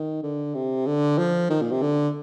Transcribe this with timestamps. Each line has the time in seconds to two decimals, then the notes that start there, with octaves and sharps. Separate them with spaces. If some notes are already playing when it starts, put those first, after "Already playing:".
Already playing: D#3
0.23 D3
0.55 C3
0.87 D3
1.18 F3
1.50 D#3
1.62 A#2
1.72 C3
1.82 D3